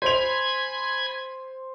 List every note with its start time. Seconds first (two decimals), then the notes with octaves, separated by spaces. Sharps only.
0.02 C5 G#5 B5 G#6 F7